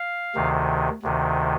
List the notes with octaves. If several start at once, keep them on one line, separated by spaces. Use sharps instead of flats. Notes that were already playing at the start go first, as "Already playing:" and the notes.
Already playing: F5
D2 C3 D#3
D2 C3 D#3